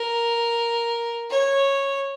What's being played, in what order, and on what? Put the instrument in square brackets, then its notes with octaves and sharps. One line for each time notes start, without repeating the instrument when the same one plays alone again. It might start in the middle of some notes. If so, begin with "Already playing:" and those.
Already playing: [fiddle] A#4
C#5